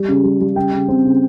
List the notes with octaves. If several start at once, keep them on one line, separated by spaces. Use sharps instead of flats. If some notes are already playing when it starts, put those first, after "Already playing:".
Already playing: G3
C#3
G3
G3
C#3 G5
C#3
C4
C#3